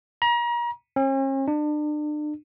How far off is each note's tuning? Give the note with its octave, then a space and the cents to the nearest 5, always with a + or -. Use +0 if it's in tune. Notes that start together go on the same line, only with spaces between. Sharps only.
A#5 +35
C#4 -45
D4 +35